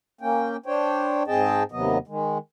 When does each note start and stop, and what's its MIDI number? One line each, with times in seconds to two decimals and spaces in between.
0.21 0.57 58
0.21 0.57 61
0.21 0.57 79
0.66 1.23 62
0.66 1.23 72
0.66 1.23 73
0.66 1.23 79
1.27 1.63 44
1.27 1.63 60
1.27 1.63 68
1.27 1.63 75
1.27 1.63 79
1.27 1.63 81
1.72 1.98 39
1.72 1.98 48
1.72 1.98 54
1.72 1.98 59
1.72 1.98 75
2.07 2.38 51
2.07 2.38 56